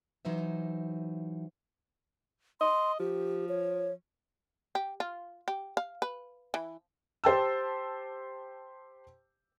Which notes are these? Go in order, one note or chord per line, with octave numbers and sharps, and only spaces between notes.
E3 F#3 D#4 C5 E5
D#5 C6
F3 G4
C#5
G4
F4
G4
F5
B4
E3
G4 C5 A5 E6